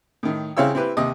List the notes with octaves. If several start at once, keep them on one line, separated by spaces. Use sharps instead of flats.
A2 D#3
C#3 C4 E4 C#5 F5 E6
C4 E4 G4 B4
D#2 C3 D#5 D#6